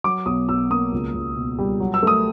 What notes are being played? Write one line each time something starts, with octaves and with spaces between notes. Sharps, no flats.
F#3 D6
B1 D#6
B1 E6
A#3 D#6
C#2
C#2
B2
G3
F#3
E6
A3 D#6